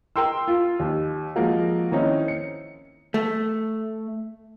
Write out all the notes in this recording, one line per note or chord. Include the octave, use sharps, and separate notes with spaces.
A#4 G5 C6 E6
F4
D#2
F3 G#3 A#3 F#4
D#3 A#3 C4 C#4 D#4 E4
C#7
A3